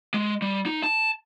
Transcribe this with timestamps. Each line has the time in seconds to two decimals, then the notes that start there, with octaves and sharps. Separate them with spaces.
0.14 G#3
0.42 G3
0.66 D#4
0.83 A5